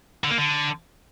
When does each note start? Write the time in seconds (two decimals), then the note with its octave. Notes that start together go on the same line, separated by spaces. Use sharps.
0.24 D3
0.31 A#3
0.38 D3